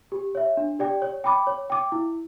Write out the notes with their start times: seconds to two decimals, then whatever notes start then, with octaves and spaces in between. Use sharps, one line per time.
0.12 G4
0.35 C#5 E5
0.57 D4
0.79 G4 D5 G5
1.02 C#5
1.24 G5 B5 D6
1.47 C#5
1.70 G5 D6
1.92 E4